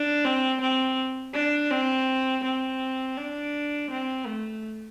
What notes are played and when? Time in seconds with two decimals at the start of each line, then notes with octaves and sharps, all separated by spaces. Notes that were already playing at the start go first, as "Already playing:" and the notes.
Already playing: D4
0.24 C4
0.61 C4
1.34 D4
1.71 C4
2.43 C4
3.17 D4
3.90 C4
4.26 A3